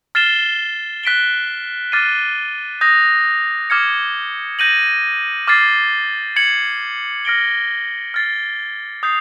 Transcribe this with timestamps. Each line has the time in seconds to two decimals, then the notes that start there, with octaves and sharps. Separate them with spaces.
0.15 F6 A6 C7 E7 G7
1.04 F#6 B6 D7 G7
1.92 D6 F6 A6 C7 D#7
2.81 D#6 G6 A#6
3.70 D6 F6 G#6 C#7
4.59 G6 A#6 D#7 F#7
5.48 D6 F6 A6 C7
6.36 G#6 C#7 F#7
7.25 F6 A#6 D7 G7
8.14 F6 A6 C7
9.03 D#6 G6 C7